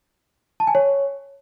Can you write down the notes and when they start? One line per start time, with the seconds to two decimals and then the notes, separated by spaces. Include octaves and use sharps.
0.60 A5
0.67 G#5
0.75 C#5